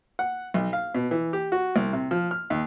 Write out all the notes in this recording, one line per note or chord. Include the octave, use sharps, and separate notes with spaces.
F#5
B1
F5
B2
E3
G4
F#4
C2
C3
F3
F6
D#2